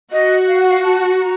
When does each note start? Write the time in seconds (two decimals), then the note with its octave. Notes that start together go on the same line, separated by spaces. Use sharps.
0.12 F#4 D#5
0.48 F5
0.60 F#5
0.71 F5
0.84 A5
1.20 A#5